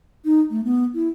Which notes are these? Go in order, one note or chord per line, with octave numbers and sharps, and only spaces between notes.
D#4
A3
B3
E4